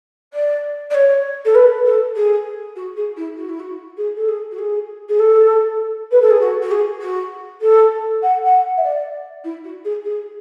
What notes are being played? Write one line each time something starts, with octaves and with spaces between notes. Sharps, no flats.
D5
D5
C#5
A4
B4
A4
G#4
F#4
G#4
E4
F#4
E4
F#4
G#4
A4
G#4
F#4
G#4
G#4
A4
B4
A4
G#4
F#4
F#4
G#4
F#4
A4
F#5
F#5
E5
D5
E4
F#4
G#4
G#4